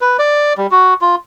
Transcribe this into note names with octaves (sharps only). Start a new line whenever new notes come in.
B4
D5
G3
F#4
F4